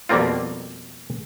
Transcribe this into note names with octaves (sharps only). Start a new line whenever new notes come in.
F2 B2 G3 A#3 C4 F4